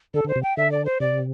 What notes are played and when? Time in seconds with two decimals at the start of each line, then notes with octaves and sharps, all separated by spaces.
0.14 D3 A4
0.25 D3
0.28 C5
0.36 C3
0.43 G5
0.57 D3 E5
0.72 D5
0.85 C5
1.00 C3 D5